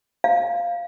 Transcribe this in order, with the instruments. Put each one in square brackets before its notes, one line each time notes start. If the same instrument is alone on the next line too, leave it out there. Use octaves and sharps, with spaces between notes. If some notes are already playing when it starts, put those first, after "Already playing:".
[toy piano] F5